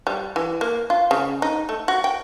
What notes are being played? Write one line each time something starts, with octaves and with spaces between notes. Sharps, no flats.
G3
E3
A#3
F4
C#3
D#4
A3
F#4
G5